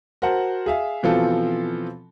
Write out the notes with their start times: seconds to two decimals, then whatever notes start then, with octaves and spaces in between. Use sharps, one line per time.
0.22 F#4 A#4 C5 F#5 A5
0.66 G#4 E5 F5
1.03 B2 E3 F3 C4 F4 A4